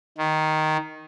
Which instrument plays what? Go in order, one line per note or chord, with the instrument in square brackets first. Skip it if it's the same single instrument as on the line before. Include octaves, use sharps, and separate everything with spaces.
[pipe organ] D#3